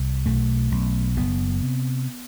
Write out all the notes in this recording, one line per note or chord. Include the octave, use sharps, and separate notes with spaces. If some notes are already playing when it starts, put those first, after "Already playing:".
Already playing: C2
B1 A3
B1
F#1 B3
C3